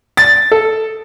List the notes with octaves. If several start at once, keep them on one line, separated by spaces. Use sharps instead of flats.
A6
A4